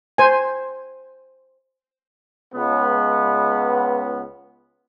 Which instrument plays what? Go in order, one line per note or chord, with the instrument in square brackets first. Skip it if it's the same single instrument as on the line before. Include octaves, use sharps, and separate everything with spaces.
[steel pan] C5 G#5
[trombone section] C#2 B3